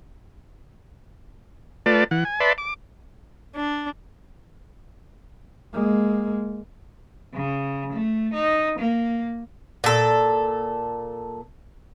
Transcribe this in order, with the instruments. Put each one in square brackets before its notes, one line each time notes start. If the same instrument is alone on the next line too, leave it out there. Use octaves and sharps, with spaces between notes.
[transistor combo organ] A3 F4 B4 D5 A5
E3 F#5
G#5
B4 D5 E5 A5 B5 C6
D6
[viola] D4
[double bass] G#3 A#3
[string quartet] C#3
A3
D#4
A#3
[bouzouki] A#2 A4